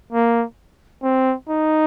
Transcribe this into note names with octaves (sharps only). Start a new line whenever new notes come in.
A#3
C4
D#4